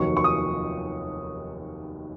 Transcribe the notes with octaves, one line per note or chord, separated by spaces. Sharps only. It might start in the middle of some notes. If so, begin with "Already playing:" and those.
Already playing: F1 D#2 D#3 F#3 C#6
C#6
D#6